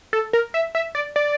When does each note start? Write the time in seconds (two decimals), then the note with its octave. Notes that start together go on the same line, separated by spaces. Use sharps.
0.13 A4
0.33 A#4
0.54 E5
0.75 E5
0.95 D5
1.16 D5